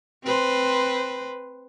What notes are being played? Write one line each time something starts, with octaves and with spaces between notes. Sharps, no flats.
C4 B4 C5